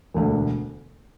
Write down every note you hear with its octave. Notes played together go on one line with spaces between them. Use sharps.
E1 D2 D3